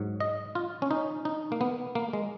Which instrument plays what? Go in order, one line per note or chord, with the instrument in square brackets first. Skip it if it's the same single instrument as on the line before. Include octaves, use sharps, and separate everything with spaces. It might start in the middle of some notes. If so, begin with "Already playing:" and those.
Already playing: [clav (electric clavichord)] G#2 F#3
D#5
F4
C#4
D#4
D#4
A#3
B3
A#3
G#3